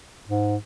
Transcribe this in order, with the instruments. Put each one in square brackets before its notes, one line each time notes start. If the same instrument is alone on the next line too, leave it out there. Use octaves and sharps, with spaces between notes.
[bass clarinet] G#2